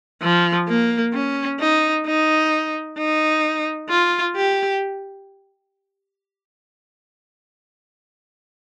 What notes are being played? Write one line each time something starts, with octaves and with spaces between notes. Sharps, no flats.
F3
A#3
C#4
D#4
D#4
D#4
F4
G4